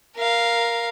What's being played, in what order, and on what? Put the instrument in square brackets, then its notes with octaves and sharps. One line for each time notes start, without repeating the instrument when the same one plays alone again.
[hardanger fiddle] A#4 F5